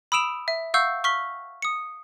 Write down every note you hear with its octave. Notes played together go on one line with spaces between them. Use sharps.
B5 D#6 E6 D7 E7 F7
E5
F5 F#5 C#6 E6 G6
C#6 F6 B6 G7
D#6 C#7